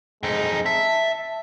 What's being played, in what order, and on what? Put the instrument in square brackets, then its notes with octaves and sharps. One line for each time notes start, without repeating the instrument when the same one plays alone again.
[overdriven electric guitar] F2 D#4 [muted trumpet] G#3
[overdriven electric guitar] E5 [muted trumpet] A5